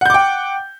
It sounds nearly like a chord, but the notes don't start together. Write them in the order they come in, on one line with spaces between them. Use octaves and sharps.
F#5 G6 D6 G5